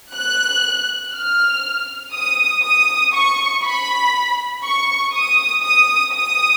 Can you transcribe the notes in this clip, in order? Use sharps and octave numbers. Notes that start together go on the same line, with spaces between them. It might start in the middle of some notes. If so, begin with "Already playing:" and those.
F#6
F6
D#6
D#6
C#6
B5
C#6
D#6
D#6
D#6